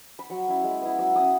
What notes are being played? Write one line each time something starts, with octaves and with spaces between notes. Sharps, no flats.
B5
F#3 C#6
C#4 E4
G#3
B3 E4
F#3 E6
C#4 E4 D#6